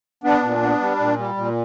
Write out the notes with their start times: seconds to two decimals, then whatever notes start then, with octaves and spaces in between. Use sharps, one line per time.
0.24 B3 D4
0.43 A#2
0.63 B3
0.81 G3
1.00 A#2
1.18 G3
1.37 A#2